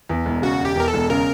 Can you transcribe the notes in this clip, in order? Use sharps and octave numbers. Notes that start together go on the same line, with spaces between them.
E2
E1
C#3 F#4
E1 G4
E2 A#4
A4
E1
C#3 A#4